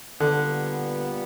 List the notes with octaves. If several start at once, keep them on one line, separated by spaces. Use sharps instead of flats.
A#2 D3 G3 B3